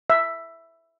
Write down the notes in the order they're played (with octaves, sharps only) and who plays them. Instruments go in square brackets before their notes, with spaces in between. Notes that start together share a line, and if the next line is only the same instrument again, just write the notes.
[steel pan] E5